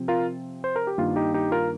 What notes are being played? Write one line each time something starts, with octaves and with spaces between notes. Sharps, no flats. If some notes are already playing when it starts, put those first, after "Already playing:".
Already playing: C3 F3 C4
F4 A#4
C5
A#4
G4
G2 D#3 A#3 F4
D#4 G4
D#4 G4
F4 A#4